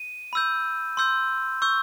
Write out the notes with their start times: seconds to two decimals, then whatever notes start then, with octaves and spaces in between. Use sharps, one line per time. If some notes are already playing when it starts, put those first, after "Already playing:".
Already playing: D#7
0.33 B5 E6 G6
0.97 C6 E6 G6
1.62 C#6 E6 G6